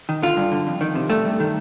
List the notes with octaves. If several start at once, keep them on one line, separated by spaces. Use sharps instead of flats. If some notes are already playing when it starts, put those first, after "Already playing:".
D#3
D3 F4
G2
D3
F2
D#3
C3
G2 A3
G2
D#3